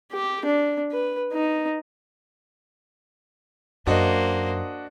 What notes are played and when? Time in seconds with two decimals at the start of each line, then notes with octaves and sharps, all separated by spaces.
0.13 G4
0.45 D4
0.91 B4
1.33 D#4
3.87 F#2 A#3 D4 F#4 C5 D#5